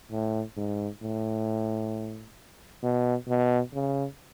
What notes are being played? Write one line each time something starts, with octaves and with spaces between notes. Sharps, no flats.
A2
G#2
A2
B2
B2
C#3